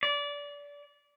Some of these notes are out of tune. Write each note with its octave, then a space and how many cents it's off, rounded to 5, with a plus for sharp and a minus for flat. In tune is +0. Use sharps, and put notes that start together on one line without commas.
D5 -25